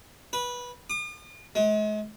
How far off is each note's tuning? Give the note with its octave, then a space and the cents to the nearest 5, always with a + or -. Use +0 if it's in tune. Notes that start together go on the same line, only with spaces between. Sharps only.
B4 -15
D#6 -45
G#3 +40